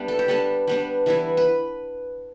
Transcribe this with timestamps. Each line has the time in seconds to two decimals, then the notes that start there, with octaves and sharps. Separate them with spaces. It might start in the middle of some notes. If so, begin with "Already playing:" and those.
Already playing: G3 B3 D4 E5
0.08 A4
0.19 G4
0.28 G3 B3 D4 A4
0.67 G3 B3 D4
1.06 E3 G3 B3 E4
1.37 B4